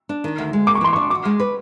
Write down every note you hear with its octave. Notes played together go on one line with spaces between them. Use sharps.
D4
D#3
D2
G#3
A#3 D6
C#6
E3 C6
C#6
D4
F#4 D6
G#3
B4